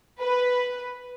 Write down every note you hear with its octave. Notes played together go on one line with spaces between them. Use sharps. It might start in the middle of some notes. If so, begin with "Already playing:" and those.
B4